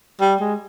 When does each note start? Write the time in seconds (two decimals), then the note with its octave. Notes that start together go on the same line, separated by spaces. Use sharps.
0.21 G3
0.40 G#3